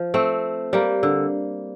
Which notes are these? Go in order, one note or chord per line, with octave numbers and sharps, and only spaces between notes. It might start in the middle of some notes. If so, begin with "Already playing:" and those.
Already playing: F3
A3 C4
G3 A#3
D3